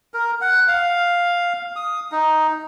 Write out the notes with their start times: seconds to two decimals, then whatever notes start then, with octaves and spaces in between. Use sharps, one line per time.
0.14 A#4
0.41 F#5
0.68 F5
1.76 D#6
2.12 D#4